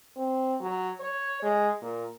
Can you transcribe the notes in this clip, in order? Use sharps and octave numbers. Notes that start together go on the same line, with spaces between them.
C4
F#3
C#5
G#3
A#2